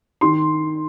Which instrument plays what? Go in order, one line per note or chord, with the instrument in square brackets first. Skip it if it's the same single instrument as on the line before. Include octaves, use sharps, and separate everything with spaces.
[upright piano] D#3 C6